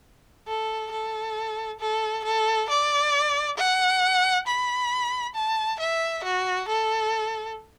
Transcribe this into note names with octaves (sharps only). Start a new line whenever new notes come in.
A4
A4
A4
A4
D5
F#5
B5
A5
E5
F#4
A4